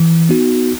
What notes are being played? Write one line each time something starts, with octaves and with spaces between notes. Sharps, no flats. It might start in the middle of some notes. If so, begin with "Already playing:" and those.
Already playing: E3
B3 D#4 F#4